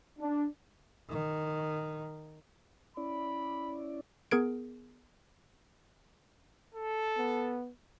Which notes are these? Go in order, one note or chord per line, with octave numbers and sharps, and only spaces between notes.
D4
D#3
C#4 E4 D5 B5
B3 G#4 A#4 G#6 D7
A4
B3